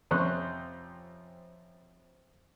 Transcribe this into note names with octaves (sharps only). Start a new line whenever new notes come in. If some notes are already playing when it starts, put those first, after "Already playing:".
F2 C3 C#4 C5 C#6 F#6